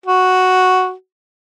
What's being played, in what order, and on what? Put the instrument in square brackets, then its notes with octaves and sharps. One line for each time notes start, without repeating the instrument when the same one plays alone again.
[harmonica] F#4